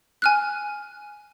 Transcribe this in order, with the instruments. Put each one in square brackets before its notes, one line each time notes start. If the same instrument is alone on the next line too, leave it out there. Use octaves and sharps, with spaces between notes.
[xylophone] G#5 F6 F#6